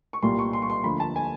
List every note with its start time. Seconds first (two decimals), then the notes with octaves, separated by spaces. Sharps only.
0.13 C#6
0.23 C2 A#2 G3 A#3 C6
0.39 C#6
0.53 C6
0.62 C#6
0.70 C6
0.84 D2 D3 F3 A#3 B5
1.00 A5
1.16 G#5